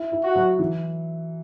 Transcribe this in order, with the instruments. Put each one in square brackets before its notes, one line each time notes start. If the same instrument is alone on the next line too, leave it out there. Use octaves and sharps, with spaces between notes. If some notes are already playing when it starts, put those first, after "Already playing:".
Already playing: [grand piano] E4
E4
[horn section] F#4
[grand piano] F#3
E3